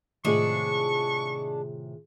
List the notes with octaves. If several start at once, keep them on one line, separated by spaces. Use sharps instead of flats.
A2 C3 D#3 G#3 D4 F4 G#4 C#6